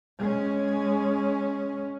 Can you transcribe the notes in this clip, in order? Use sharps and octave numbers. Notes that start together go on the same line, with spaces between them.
G#3 C#4